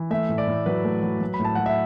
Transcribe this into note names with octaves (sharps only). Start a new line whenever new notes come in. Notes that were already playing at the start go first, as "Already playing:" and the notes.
Already playing: E3
A3 E5
A2
D5
A2
F#3 B4
A3
F#3
F#3
B5
A2
A5
F#3 F#5
E5